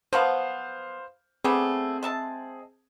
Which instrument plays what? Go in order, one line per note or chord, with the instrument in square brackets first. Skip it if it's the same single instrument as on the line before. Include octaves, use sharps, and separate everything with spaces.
[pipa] F3 F#3 B3 [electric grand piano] C5 F5
[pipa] G3 A3 B3 [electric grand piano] C4 G#4
[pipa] G#3 E5 A5